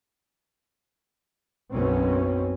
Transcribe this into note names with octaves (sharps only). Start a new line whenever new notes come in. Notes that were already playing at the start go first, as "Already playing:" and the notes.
B1 F#2 B2 C4 C#4